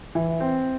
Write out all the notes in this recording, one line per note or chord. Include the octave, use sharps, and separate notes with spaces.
E3
C4